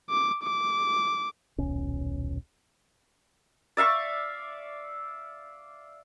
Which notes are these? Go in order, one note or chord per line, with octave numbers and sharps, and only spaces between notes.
D6
D6
D#1 B1 C#4
D5 E5 F5 C#6